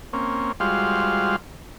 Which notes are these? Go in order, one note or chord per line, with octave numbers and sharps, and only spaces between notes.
A#3 C4 C#4
G3 G#3 F4 F#4 C5 F5